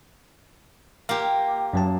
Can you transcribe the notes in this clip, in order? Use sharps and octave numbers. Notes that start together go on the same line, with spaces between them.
A#3 F4 G4 F5
F#2 F#3 A5